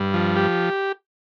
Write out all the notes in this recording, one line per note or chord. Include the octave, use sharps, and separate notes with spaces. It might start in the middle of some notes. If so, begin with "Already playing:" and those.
Already playing: G2
F3
G4